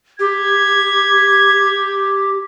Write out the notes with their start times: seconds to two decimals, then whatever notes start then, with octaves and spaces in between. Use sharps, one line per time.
0.20 G4 G#6